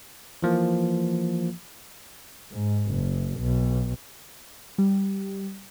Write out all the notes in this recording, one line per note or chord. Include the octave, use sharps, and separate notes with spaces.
E3 F3 A#3
G#2
F#1
B1
G3